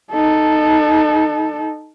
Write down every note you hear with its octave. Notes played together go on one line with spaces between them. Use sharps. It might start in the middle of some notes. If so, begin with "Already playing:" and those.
D#4 A4